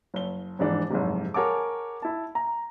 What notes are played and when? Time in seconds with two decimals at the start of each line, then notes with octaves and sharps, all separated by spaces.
0.14 F#1 G7
0.59 F1 G#2 E3 D4
0.90 F#1 F2 G#2 C3
1.34 G#4 A#4 C#5 F#5 A5 D6
2.02 E4 A5
2.35 A#5